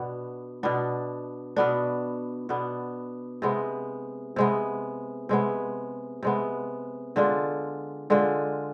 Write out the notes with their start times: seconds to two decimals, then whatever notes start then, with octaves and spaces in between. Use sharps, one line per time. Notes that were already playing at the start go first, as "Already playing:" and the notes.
Already playing: B2 B3 D4
0.63 B2 B3 D4
1.56 B2 B3 D4
2.49 B2 B3 D4
3.42 C3 G#3 B3
4.36 C3 G#3 B3
5.29 C3 G#3 B3
6.23 C3 G#3 B3
7.16 D3 G#3 D4 F4
8.10 D3 G#3 D4 F4